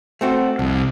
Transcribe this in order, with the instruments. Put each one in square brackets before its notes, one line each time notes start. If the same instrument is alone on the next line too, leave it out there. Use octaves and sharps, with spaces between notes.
[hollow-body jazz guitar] A3 C4 F#4
[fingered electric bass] C2 [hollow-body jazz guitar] F2